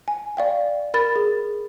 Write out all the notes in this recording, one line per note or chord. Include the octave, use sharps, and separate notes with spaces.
G#5
D5 F5 G5
A#4 B5 A6
G#4